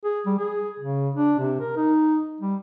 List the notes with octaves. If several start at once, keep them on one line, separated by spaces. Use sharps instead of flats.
G#4
G3
G#4
C#3
D4
C3
A#4
D#4
G3